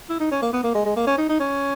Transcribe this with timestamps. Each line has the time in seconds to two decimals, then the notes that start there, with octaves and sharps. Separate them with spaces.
0.10 E4
0.20 D#4
0.31 C#4
0.42 A#3
0.53 B3
0.64 A#3
0.75 G#3
0.86 G#3
0.96 A#3
1.07 C#4
1.18 D#4
1.29 D#4
1.40 C#4